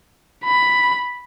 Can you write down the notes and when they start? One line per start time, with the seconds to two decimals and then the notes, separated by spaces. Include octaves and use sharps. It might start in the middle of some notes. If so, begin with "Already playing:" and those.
0.45 B5